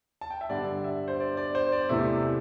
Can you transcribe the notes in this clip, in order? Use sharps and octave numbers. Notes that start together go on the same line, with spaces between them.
A5
G5
E5
G2 D3 G3 D5
E5
C5
D5
D5
C5
D5
E2 C3 E3 A3 E5